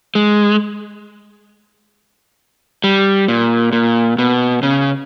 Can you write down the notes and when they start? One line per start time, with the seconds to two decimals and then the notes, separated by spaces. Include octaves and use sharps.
0.15 G#3
2.84 G3
3.28 A#2
3.73 A#2
4.19 B2
4.63 C#3